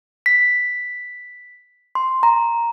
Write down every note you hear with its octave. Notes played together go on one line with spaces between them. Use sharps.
B6
C6
A#5